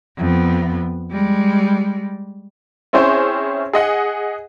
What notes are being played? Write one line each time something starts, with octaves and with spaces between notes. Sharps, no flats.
F2 B3
G3 G#3
C4 C#4 E4 G#4 C5 C#5
G#4 D#5 F#5